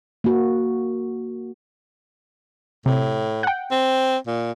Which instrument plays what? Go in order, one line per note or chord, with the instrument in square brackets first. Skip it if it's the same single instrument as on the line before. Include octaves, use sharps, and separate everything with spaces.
[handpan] A#3 F#4
[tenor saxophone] A2 [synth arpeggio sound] C3
[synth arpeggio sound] F#5 G5
[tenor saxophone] C4
A#2